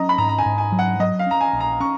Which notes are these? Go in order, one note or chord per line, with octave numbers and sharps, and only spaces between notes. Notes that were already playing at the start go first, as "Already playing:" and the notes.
Already playing: F#3 C#4 D#5 A#5
B5
G#2 A#5
A#5
G#5
G#2
G#5
F#3
F#5
F#3 D#5
F5
C#4 A#5
G#5
A#1
A#5
C#4 C#6